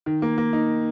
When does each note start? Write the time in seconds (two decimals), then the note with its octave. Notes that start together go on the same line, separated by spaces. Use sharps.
0.06 D#3
0.22 A#3
0.38 A#3
0.53 D#4